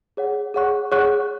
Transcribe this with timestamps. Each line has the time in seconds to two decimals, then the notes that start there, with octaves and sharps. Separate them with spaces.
0.17 G#4 C#5 F#5
0.54 G#4 C#5 F#5 C#6 F#6
0.92 G#4 C#5 F#5 C#6 F#6